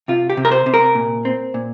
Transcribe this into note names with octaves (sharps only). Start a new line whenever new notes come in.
C3 F4
G4
C3
A#4
C5
C3
A#4
A#2
C4
A#2